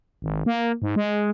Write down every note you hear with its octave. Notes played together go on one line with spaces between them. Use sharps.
G#1
A#3
G#2
G#3